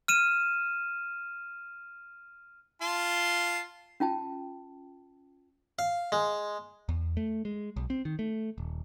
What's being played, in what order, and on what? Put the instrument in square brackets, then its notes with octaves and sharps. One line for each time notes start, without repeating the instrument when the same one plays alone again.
[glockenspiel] F6 D#7 E7
[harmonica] F4 A5 C6
[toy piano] C#4 F4 G5 A5
[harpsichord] F5
G#3
[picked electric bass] E2
A3
G#3
B1
C4
D#3
A3
D#1